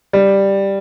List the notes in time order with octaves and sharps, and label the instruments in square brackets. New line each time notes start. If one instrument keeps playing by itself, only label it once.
[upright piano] G3